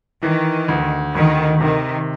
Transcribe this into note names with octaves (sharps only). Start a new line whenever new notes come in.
D#3 E3
D2
D2 D#3
C3 D#3